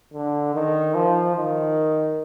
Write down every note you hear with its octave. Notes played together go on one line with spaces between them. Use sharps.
D3
D#3
F3
D#3